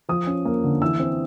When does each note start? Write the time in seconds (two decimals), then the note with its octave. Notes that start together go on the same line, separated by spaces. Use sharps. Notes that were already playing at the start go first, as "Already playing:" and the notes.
0.09 F3 D#6
0.27 C#4
0.45 A#3
0.64 D3
0.82 E3 E6
1.00 C4